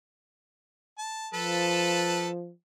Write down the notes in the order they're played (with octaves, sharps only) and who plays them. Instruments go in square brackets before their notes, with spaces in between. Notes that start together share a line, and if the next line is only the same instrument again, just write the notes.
[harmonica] A5
[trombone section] F3 [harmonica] A4 B4 A5